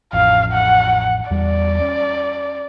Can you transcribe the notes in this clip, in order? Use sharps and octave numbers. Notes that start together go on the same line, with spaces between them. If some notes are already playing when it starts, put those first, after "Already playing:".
A1 F2 F5
F#5
E2 G3 D5
C#4